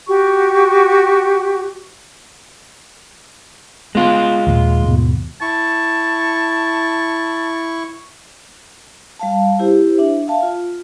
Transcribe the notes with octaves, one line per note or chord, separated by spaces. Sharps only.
F#4 G4 C#6
G#3 B3 F4
D#2 A#2
D#2 G#2 B2
E4 A5 C#6
G3 F5 A5
E4 G4 C5
D4 E5
E5 F5 A5
F4